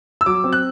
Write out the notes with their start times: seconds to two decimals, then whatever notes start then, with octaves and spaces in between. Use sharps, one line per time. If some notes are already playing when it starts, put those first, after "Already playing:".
0.21 E6
0.26 F#3 D6
0.44 C4
0.53 F#6